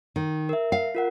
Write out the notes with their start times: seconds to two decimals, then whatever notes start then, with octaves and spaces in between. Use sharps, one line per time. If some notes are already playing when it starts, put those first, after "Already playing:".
0.16 D#3
0.49 A#4 E5
0.72 F5
0.95 F4 A#4 F#5